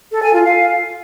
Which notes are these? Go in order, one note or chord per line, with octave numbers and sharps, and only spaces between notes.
A4
G#5
F4
F5